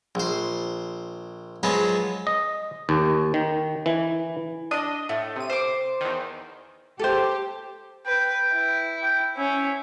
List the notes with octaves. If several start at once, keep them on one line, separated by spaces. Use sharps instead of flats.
A#1 C5
F3 F#3 G#3 B3 B4
D#5
D#2
D#3
E3
D4 D#5 D#6
A2 A3
C3 D#7
C5 D6
E2 D#3
G4 A4 C5
B4 G5
E4
G5
C#4 E4